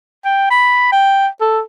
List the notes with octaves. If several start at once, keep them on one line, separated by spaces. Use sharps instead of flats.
G5
B5
G5
A4